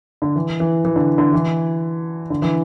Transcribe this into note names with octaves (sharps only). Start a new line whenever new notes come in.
D3
E3
E3
E3
D3
D3
E3
D3
E3